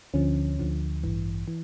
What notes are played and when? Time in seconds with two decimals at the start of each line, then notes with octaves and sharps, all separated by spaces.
0.14 D2 D3 F3 C#4
0.59 D2 D3 F3
1.03 A1 G2 E3
1.48 E3